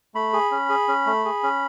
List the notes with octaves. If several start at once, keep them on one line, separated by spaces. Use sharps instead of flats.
A3 B5
G#4
C#4
G#4
C#4
A3
G#4
C#4